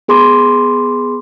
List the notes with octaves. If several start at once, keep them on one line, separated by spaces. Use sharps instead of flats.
B3 G#4 B5 C6 D6